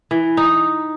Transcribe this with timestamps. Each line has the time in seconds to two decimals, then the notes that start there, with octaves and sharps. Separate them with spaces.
0.11 E3
0.37 D#4